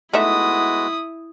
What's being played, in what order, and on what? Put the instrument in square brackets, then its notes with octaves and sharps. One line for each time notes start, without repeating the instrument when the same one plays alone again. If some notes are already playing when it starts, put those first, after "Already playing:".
[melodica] G#3 B3 F#4 [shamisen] A3 D#4 E5 [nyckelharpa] E4 D#6